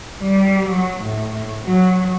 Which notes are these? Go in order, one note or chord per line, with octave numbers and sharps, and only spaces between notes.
G3
F#3
A2
F#3